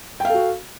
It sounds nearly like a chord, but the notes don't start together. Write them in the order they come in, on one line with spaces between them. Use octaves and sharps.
G5 F5 A4 F#4